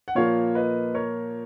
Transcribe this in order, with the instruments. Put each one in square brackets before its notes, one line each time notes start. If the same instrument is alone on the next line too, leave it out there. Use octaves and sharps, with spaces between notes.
[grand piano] F#5
A#2 F3 A#3 C#5 F5
B4 D#5
A#4 C#5